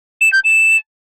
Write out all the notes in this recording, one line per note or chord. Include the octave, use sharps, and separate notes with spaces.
E7
G6
E7